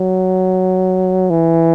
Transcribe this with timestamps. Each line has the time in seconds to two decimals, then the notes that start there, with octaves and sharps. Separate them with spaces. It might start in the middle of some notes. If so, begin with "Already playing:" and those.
Already playing: F#3
1.30 E3